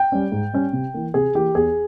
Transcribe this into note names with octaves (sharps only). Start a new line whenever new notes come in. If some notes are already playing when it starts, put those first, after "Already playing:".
Already playing: G5
G3 C#4
G#2
G3 C#4
C3
E3 A#3
C3 G#4
E3 A#3 G4
E2 G#4